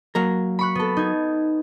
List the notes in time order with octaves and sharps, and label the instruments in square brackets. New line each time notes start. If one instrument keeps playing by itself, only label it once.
[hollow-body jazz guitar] F#3 A#3 A#4
[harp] B5 C#6 F#6
B3 A4
D#4 G#6